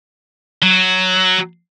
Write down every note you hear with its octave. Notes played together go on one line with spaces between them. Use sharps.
F#3